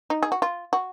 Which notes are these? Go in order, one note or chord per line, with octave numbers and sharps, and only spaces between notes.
D#4
G#4
F#4
F4
F#4